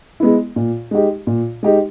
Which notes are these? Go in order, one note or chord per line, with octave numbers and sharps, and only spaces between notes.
G#3 B3 E4
A#2
G#3 D#4 G4
A#2
G#3 D#4 G4